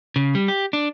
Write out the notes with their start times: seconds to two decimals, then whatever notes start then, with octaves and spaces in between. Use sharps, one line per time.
0.16 C#3
0.35 G3
0.48 G4
0.73 D4